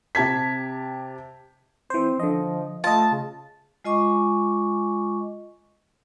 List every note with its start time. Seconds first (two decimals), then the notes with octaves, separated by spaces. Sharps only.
0.15 C3 G4 A5 G#6 B6
1.90 E3 C4 C5
2.19 D3 F3 D#5
2.84 A3 F4 D#5 A5
3.12 C#3
3.84 G#3 F4 D#5 G#5 C#6 D6